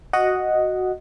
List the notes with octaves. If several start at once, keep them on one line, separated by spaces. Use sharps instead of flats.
F#4 D#5 F#5